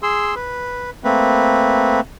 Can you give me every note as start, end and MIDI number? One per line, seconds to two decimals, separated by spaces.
0.03 0.35 68
0.03 0.35 84
0.03 0.35 88
0.36 0.90 71
1.04 2.00 57
1.04 2.00 58
1.04 2.00 60
1.04 2.00 71